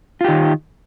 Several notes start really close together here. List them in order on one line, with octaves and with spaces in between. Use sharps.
F4 G4 D#3